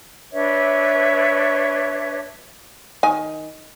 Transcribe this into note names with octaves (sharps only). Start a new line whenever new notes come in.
D4 B4 C#5 E5
D#3 G#5